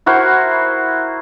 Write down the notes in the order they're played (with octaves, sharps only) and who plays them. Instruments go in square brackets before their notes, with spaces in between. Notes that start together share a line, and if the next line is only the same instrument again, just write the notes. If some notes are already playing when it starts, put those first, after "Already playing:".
[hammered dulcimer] E4 F#4 A#4 C5